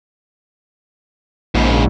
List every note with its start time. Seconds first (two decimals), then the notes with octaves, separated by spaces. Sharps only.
1.55 A#1 G#2 C#3